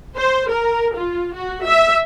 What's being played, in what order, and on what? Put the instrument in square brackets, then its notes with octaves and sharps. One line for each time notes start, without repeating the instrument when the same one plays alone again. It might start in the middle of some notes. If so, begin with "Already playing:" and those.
[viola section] C5
A#4
F4
F#4
E5